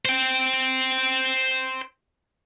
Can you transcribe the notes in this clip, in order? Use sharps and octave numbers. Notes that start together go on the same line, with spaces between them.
C5 G5